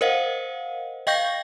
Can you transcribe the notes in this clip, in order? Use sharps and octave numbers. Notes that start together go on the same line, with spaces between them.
A#4 C5 D#5 F5 F#5
D#5 F5 G5 C#6 G6 A#6